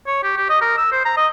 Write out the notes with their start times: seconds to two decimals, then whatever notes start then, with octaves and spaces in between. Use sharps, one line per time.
0.07 C#5
0.23 G4
0.37 G4
0.49 D#5
0.61 A#4
0.77 E6
0.92 C5
1.05 A#5
1.17 D#5